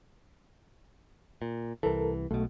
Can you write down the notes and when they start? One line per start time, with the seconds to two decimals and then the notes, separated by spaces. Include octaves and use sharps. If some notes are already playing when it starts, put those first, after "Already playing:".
1.42 A#2
1.83 C2 E3 A4 A#4
2.31 B1 B2 A3